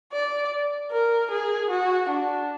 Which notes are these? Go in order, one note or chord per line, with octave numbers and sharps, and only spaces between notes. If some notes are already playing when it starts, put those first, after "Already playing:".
D5
A#4
G#4
F#4
D4